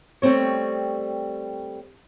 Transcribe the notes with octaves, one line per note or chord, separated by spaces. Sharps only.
G3 A3 C4 C#5